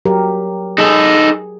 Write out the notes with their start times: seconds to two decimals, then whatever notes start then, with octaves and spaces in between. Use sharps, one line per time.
0.05 F#3 G4 A#4
0.78 D#4 G#4 A4